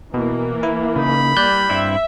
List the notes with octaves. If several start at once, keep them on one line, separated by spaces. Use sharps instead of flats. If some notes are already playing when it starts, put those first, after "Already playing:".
B2 E3 A#3
E4
C#3 D#4 B5
G3 D5 F#6 G6
G2 C4 E4 E5